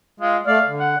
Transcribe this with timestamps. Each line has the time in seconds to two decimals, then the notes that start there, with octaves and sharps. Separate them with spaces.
0.20 G#3 F4
0.47 A3 D5 F5
0.67 D3
0.80 F#5